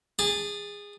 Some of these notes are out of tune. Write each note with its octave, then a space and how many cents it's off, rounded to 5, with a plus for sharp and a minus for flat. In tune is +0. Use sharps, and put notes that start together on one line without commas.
G#4 -20 A5 +0